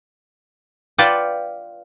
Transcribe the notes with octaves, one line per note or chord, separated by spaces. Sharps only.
F4 B4 D5 F#5 G5 A5